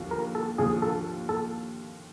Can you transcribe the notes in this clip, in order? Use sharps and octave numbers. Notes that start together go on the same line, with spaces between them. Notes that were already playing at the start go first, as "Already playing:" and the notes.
Already playing: D#2 D3 F3
A#4
A4
D#2 D3 F3 G#4
A4
A4